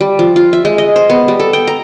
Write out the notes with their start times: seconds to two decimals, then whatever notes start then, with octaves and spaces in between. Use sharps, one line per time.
0.01 G3
0.19 F3
0.36 F4
0.53 E5
0.65 G#3
0.78 D#5
0.96 C5
1.10 B3
1.28 G3
1.40 A4
1.53 G5
1.67 A#5